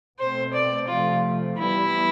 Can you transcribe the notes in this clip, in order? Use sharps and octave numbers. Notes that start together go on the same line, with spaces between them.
B2 A3 C4 C5
D5
C3 F3 A3 F4
E3 G3 B3 E4